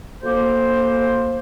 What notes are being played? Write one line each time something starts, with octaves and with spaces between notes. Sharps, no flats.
D2 A#3 C5